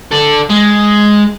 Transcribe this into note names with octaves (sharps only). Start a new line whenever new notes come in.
A4 D5
G#3